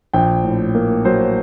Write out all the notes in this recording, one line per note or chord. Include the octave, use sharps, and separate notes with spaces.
A#1 G5
A2
A#3
F#3 C5